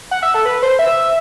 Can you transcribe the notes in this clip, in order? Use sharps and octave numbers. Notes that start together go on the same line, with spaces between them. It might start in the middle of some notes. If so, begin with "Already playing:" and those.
F#5
E5
A4
B4
C5
E5